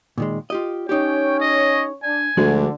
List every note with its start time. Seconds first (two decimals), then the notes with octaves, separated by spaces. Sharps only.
0.18 A#2 D#3 G#3
0.50 F4 G4 D#5
0.89 C#4 D#4 G4 C#5 G5
1.40 D#5
2.03 D4 G#5
2.37 D2 D3 F3 G#3 F#4